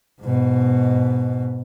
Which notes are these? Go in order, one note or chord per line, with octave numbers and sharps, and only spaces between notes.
G#2 B2